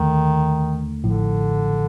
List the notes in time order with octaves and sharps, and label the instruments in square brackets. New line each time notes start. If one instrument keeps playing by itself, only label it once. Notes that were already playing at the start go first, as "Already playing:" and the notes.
Already playing: [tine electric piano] D#2 D3 A3 [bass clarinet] D#3
[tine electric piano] A1 A2 F3 [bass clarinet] D3